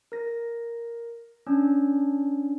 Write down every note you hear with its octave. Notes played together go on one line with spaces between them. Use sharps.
A#4 A#6
C#4 D4